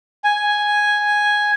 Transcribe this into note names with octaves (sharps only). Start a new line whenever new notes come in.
G#5